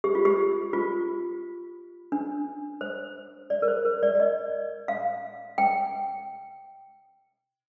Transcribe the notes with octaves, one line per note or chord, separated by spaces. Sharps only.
G4
F4
G4
F4
D4
C5
D5
A#4
C5
A#4
D5
D5
D#5
F5
G5